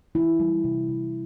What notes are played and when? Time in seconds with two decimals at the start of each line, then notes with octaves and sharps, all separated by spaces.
0.15 E3 E4
0.39 G3
0.64 C3
0.89 C3